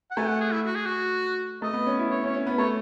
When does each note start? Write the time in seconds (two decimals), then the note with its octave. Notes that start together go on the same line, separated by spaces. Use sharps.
0.11 F#5
0.17 A3 G#5
0.28 F#5
0.40 G#4
0.52 E4
0.65 F#4
0.75 G#4
0.86 F#4
1.62 A3 D#5
1.73 B3
1.86 C#4
1.99 E4
2.10 C#4 C#5
2.23 C#4
2.26 C#5
2.34 C#4
2.47 B3
2.58 A3 C#5